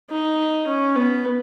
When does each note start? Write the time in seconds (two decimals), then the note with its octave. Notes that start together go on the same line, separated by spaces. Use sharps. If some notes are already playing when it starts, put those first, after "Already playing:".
0.11 D#4
0.67 C#4
0.96 B3